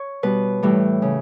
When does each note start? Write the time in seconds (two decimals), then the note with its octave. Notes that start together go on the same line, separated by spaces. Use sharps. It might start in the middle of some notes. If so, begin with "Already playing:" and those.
Already playing: C#5
0.23 B2 G3 B4
0.63 A2 E3 G3
1.02 C#3